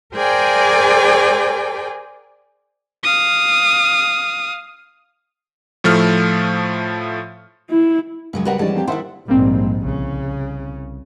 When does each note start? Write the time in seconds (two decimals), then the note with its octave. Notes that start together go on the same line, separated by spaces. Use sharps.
0.15 G#4 A#4 C5 D5 G5 G#5
3.03 F5 D#6
5.84 A2 F3 A3 F6
7.70 E4
8.33 C#2 F#2 F#3 G#3
8.45 G3 F#4 A#4 B4 F#5
8.59 F2 E3 G3 G#3 C#4 D5 A5
8.74 A#3 C4 G4
8.87 D#3 D4 E4 C5 E5 F#5
9.28 A#1 G#2 G3 A#3 C4
9.85 C2 C#3